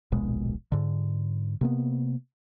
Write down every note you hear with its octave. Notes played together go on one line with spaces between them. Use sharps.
D1 A#1 B2 G#3
G#2 D3
C3 A#3 B3